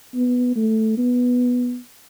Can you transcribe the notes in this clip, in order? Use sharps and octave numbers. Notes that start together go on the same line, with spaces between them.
B3
A3
B3